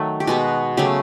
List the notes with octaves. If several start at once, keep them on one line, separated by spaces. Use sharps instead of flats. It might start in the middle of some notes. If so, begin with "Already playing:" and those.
Already playing: D#3 F#3 A3
G4
B2 G#3 B3 F#4
C#3 F#3 A3 G4